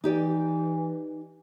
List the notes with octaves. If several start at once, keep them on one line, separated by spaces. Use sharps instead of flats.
E3 D#4 G4 D5